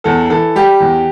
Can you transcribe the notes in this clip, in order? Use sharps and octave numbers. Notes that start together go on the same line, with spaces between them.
E2 A4
E3 A4
G3 G4
E2